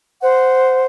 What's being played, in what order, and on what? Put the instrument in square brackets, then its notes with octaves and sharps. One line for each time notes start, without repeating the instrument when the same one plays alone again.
[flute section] C5 F#5